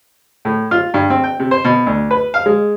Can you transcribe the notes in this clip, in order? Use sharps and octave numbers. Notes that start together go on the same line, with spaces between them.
A2
F4
G2
C4
G5
C3
C5
B2
D2
B4
F5
G#3